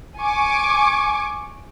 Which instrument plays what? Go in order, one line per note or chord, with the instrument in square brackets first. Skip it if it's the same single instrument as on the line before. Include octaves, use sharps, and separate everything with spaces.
[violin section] G#5 C#6 D6